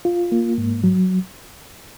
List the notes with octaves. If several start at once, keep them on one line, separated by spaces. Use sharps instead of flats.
F4
A#3
G#2
F#3